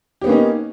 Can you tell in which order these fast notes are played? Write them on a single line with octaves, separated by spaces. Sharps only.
G4 B3 A#3 C#4 D#4